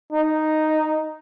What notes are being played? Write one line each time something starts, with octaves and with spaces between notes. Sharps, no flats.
D#4